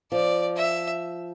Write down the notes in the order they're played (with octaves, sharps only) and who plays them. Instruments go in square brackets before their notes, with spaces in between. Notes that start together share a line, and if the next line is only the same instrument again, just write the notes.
[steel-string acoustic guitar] F3 [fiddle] D5
[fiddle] E5